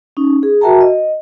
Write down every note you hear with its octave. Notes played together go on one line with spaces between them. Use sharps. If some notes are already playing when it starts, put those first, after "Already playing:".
C#4 D#4
G#4
F#4 A#4 E5 G5 A5 A#5
D#5